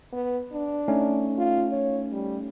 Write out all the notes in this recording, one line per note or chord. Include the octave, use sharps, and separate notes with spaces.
B3
D4
A3 C#4 D#4
F4
C#5
G3